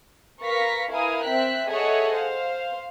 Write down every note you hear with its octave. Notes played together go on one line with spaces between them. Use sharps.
A#4 B4 F5 C#6 A#6 B6
E4 A#4 B4 F5 G#5 D#6
C4 E5 G5 F#6 B6
G#4 A4 C#5 D#5 E5 F#5
C5 F5